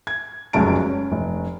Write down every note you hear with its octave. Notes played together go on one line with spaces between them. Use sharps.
G#6
F1 C#2 F#2 F#4 A5 D7
C#4
F1